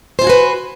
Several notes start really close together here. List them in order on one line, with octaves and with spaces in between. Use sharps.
C5 F4 G#5 F#4 B4